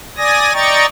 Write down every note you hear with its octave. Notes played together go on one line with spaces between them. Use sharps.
D5 G#5 D#6 A#6
D5 D#5 G5 A#5 C#6 A6